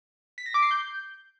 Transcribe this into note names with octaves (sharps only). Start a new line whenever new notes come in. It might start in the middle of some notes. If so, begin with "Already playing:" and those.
B6
A#6
D6
C7
G6